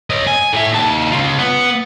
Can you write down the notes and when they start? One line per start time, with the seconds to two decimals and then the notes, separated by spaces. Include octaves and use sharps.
0.10 C#5 D#5
0.27 G#5
0.53 A2 E5
0.72 D#2 A5
1.11 C#3 F4
1.38 B3